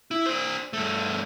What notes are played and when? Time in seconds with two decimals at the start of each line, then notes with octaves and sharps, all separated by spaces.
0.11 E4
0.26 D4 C5
0.73 G2 A3